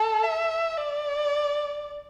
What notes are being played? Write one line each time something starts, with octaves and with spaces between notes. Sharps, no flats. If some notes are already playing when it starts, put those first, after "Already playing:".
Already playing: A4
E5
D5